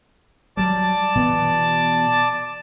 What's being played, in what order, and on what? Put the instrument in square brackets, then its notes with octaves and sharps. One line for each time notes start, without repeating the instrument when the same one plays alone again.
[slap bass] F#3 G3 [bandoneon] D5 A5 D6
[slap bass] B2 E3 B3